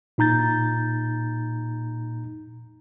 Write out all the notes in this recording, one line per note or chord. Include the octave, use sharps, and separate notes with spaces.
A#2 D#4 A#5 G6 A6